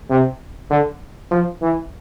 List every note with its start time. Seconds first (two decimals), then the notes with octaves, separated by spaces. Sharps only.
0.10 C3
0.71 D3
1.31 F3
1.61 E3